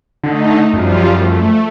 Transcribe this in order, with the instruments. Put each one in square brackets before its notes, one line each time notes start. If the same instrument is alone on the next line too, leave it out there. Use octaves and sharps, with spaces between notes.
[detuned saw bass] D3 [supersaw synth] A3 D#4
[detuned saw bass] F#2 [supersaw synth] F3 G3 F4
[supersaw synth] A3